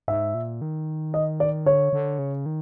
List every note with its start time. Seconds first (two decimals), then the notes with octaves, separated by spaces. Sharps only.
0.08 G#2 E5
0.34 A#2
0.62 D#3
1.14 D#5
1.40 D5
1.66 D3 C#5
1.93 D3
2.19 C#3
2.46 D#3